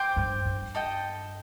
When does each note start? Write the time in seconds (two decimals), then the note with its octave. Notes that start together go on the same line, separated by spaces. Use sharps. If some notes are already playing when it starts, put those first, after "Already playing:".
Already playing: C5 G5 D6
0.16 G2
0.45 G2
0.75 A4 D#5 G5